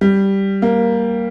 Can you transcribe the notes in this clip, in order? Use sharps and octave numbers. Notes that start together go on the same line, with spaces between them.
G3
A#3